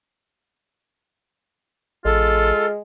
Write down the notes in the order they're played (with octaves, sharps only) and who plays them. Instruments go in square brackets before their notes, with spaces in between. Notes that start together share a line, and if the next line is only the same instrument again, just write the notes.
[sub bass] A1 [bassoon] G#3 [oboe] F4 [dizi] A4